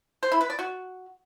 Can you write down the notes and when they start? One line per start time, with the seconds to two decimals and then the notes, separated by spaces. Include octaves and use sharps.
0.23 C5
0.32 E4
0.41 B4
0.50 D5
0.59 F#4